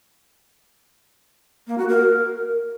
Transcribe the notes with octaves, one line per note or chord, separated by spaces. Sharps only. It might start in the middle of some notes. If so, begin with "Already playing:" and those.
A#3
F#4
A#4